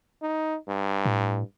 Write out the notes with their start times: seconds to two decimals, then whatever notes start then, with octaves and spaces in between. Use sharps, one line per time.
0.22 D#4
0.68 G2
1.05 A2